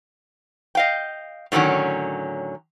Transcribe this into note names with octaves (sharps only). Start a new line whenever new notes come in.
D#5 F5 G5
A2 D3 D#3 F#3 C#4